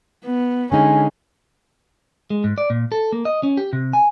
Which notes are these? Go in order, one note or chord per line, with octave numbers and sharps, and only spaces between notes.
B3
D3 G#3 C#4 D#4 G#5
G#3
G#2
D5
A#2
A4
A#3
D#5
C#4
G4
C3
G#5